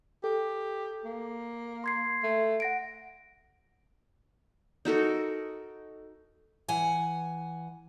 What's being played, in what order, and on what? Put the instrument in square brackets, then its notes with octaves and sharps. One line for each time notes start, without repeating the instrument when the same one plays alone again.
[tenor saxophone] G4 [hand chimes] A4
[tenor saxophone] A#3
[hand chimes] C6 G#6 C7
[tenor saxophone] A3
[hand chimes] F#5 A#6 D7
[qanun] D#4 F#4 A4 A#4
[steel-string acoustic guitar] E3 F#5 G#5